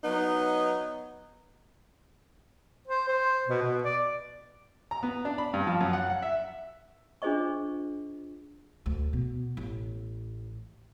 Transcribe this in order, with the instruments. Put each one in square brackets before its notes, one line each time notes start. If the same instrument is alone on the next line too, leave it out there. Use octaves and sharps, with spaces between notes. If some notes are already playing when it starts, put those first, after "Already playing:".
[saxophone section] F#3 B3 D#4
[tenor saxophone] C5
C5
B2
B2
D5
[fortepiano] A#5
B3
D4
B5
G2
F3
F#2
F#5
F#5
E5
[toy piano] D4 F4 G#4 C5 D#5 C#6
[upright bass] D2
B2
A1